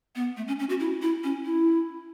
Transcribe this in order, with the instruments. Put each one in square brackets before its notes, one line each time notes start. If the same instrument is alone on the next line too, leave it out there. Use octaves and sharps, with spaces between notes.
[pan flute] B3
A3
C#4
C#4
F#4
E4
E4
C#4
E4